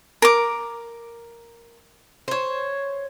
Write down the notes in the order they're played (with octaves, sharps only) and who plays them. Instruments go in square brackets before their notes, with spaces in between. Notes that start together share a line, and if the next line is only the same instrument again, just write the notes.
[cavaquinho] A#4 D6
[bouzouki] C5 C#5